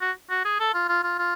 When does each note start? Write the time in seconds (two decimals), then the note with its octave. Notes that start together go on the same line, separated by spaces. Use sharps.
0.01 F#4
0.30 F#4
0.45 G#4
0.60 A4
0.74 F4
0.88 F4
1.03 F4
1.18 F4